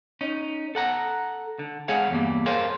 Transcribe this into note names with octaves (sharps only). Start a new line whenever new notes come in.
C#4 D#4
A4 F#5 A#5
D3
G#3 G#4 C#5 F5 F#5
E2 G2 G3 A#3
G#4 A#4 C5 C#5 F5